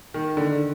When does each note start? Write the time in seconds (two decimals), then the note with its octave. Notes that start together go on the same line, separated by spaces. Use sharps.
0.14 D#3
0.37 D3